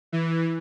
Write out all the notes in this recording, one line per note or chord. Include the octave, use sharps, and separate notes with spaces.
E3